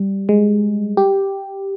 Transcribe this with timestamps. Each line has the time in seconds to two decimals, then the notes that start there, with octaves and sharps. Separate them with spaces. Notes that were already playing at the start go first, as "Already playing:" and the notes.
Already playing: G3
0.29 G#3
0.97 G4